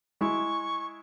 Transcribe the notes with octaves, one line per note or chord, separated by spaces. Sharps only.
G#3 E4 C#6